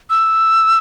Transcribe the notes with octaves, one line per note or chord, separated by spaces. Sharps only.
E6